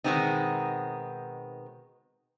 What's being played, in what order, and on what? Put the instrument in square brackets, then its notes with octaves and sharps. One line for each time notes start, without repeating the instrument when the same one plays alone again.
[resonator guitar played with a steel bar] B2 D#3 G#3 B3 C4 D#4